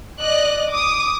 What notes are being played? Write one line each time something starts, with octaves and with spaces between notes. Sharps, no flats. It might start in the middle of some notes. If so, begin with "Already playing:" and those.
D5 D#5 F#6
D6 D#6